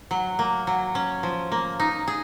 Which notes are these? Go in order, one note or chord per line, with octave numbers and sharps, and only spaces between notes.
F#3
A#3
F#3
C#4
F3
A#3
D#4
G#4